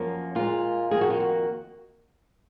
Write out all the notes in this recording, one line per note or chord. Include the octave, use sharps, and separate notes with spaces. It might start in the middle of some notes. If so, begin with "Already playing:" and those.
Already playing: F#2 F3 A#3 C#4
A#2 G#3 F4
F2 D#3 A#3 G#4
F#4
F4
F#4